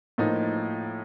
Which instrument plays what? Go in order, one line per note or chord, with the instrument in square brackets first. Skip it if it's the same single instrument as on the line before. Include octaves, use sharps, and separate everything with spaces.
[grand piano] A2 F3 A#3 D#4